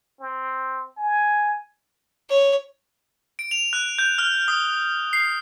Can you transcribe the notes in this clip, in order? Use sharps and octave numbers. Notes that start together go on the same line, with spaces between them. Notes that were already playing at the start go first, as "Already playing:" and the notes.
C4
G#5
C#5
D7
F7
F#6
G6
F6
D#6
C7